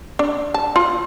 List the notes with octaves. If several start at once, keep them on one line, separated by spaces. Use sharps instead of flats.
D4
A5
F4